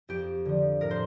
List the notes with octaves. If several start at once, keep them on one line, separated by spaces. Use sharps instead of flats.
F2 G4
D3 F3
A2 A#4
C5